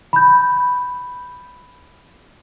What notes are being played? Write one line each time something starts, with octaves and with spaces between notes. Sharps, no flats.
B5 G6